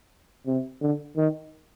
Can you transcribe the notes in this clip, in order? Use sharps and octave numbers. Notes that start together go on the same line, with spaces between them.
C3
D3
D#3